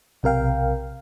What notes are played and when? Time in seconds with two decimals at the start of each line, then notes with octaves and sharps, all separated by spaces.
0.23 B1 C3 A#4 F5 G5